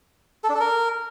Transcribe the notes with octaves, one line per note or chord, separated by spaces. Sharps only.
A4
D4
A4
A#4